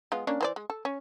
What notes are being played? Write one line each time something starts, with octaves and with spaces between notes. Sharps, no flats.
G#3 B3 F4
A#3 C#4 D4
E3 C5 D5
G#3
A4
C#4